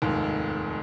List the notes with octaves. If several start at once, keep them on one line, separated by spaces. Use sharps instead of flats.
F1 D#2 G#2